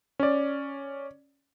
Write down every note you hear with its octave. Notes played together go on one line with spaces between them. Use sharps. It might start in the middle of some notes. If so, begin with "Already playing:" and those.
C#4 D5